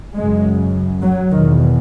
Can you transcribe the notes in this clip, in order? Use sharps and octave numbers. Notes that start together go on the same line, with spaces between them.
F#2 C#3 G#3
F#3
E2 B2 D#3